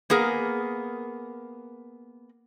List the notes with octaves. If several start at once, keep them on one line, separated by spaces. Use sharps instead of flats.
A#3 B3 G#4 A#4